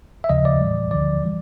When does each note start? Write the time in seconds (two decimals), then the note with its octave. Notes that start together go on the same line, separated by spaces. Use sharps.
0.24 E5
0.29 D#2 C#3 F3 D#5
0.45 D5
0.61 A2 E3 G3
0.91 D2 D3 F3 D5
1.24 E3 G3